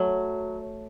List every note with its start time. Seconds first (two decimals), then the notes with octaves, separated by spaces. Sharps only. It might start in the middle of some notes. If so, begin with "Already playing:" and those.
Already playing: F#3 A3